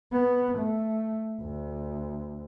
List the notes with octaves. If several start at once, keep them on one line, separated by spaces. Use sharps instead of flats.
B3
A3
D2